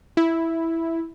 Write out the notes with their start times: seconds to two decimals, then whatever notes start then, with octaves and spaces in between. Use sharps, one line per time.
0.17 E4